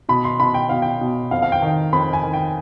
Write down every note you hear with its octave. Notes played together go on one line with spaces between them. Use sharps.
B2 B5
C6
B2 B5
G5
B2 F5
G5
B2
F2 F5
F5
G5
D#3
F2 B5
G#5
D#3
G5